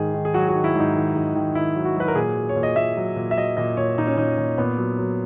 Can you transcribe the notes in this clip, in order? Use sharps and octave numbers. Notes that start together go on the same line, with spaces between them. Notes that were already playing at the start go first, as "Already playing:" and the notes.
Already playing: G#2 D#3 G#4
D#3
G#4
F#3 F#4
F#4
D#3
E4
G#2
D#4
D#3
G#2
D#3
D#3 E4
F#3
F#4
F#3 B4
A#4
A#2 G#4
F#3
C#5
A#2
D#5
A#2 E5
F#3
A#2
E5
F#3 D#5
A#2 D#5
A#2 C#5
A#2 D#4
C#4
A#2 D#4
A#2
A#2 B3
F#3
F#3